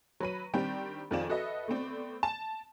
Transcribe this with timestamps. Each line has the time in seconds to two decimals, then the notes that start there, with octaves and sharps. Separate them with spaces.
0.20 F#3 B4 B5 D#7
0.54 D#3 G3 C4 D4 G4
1.11 F2 D#3 F3 G#4 D5 E7
1.29 F#4 A4 B4 D#5 E5
1.68 A3 B3 C4 D5
2.23 A5 E7